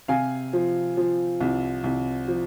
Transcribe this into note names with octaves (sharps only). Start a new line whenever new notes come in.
C3 F5 G#5
F3
F3
C2
C2
F3